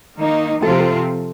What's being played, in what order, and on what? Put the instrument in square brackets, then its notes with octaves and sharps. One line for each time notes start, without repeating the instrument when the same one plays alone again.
[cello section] D#3 A#3 D#4
[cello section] C3 F3 C4 F4 [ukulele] A4
[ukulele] G4
A4